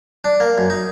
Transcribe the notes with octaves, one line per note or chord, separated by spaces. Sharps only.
D4
A#3
F#2
D#4